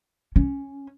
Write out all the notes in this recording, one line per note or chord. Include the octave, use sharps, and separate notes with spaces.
C#4